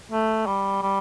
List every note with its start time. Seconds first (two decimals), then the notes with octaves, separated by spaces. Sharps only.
0.12 A3
0.47 G3
0.82 G3